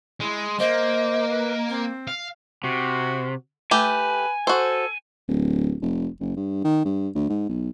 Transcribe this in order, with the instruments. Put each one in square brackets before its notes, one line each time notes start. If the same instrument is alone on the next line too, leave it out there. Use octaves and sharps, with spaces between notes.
[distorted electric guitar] G#3 [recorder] E4
[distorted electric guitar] A#3 [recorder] C5 [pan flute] D#5
[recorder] B4
C4
[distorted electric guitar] F5
[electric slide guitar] C3 [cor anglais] F#4
[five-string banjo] A3 G4 [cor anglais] B4 [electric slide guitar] G#5
[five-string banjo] F#4 C5 [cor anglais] A4
[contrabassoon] D1
F1
F#1
G2
D#3
G2
D2
G#2
B1